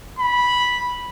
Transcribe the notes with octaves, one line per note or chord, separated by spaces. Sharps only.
B5